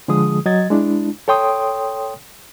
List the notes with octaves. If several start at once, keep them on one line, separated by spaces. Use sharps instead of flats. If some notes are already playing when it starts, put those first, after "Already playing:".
D3 F3 G#3 G#4 D#6
F#3 D#5 G#6 A6
G#3 D4 E4
A4 C#5 G5 C6 D#6